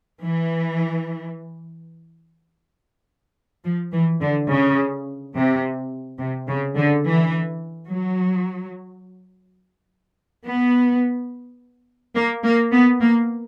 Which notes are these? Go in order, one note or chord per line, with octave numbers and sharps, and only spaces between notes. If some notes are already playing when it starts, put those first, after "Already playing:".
E3
F3
E3
D3
C#3
C3
C3
C#3
D3
E3
F#3
B3
A#3
A#3
B3
A#3